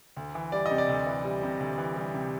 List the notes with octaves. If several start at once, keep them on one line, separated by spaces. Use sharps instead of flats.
D2
E3
G3 D5
D#5
C3
D5
D2
E3
G3
C3
D2
E3
G3
C3